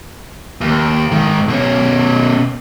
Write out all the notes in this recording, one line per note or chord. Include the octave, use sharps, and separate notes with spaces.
D#2
G#2 D#3
B2 C#4